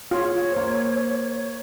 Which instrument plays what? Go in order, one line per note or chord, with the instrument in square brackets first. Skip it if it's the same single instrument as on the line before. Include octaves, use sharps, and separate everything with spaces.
[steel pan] F4 [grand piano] G#4 [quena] C#5
[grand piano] A#3 C5